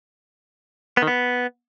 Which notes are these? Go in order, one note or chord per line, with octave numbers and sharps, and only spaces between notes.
B3
D#3
B3